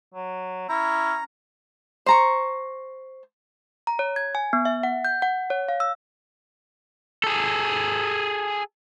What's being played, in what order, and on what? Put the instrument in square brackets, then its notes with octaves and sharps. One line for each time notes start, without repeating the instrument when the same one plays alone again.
[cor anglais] F#3
[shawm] C#4 [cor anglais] E4 [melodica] A#5
[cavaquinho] C5 A#5 C#6
[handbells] A#5
C#5
G#6
G#5
B3
E5
F#5
G6
F#5
C#5
F5
E6
[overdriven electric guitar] G#4 A4